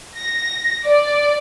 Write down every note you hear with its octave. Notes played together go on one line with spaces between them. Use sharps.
A#6
D5